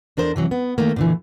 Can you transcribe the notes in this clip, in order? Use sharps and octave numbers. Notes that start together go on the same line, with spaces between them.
E2 D4 A#4 C5
C3 E3 F#3
B3
D#3 A3 A#3
A#2 D3 E3